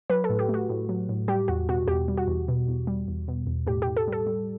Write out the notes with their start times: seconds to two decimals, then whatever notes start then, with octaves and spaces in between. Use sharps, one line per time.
0.10 F#3 B4
0.24 A4
0.30 A2
0.39 G4
0.49 A3
0.54 F#4
0.69 A2
0.89 F#3
1.09 A2
1.28 G3 G4
1.48 E2 F#4
1.69 B2 F#4
1.88 E2 G4
2.08 G3
2.17 F#4
2.27 E2
2.48 B2
2.68 E2
2.87 G3
3.08 E2
3.28 B2
3.47 E2
3.67 A2 G4
3.82 A2 G4
3.97 A4
4.08 G3 A4
4.27 G3